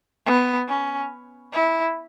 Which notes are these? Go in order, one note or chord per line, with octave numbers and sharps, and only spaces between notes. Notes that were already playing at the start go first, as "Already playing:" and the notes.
B3
C#4
E4